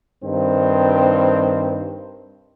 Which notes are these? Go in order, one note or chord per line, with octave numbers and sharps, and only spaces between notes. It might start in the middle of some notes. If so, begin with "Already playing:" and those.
G2 D#3 C4